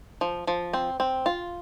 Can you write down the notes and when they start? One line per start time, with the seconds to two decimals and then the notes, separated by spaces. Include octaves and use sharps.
0.21 F3
0.47 F3
0.73 C4
1.00 C4
1.26 F4